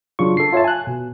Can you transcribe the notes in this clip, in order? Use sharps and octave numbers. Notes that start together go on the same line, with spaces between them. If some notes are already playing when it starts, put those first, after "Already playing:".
C#3 F#3 D4 F4 C#6
A4 C7
F4 C#5 E5 A5
G#5 F#6
B2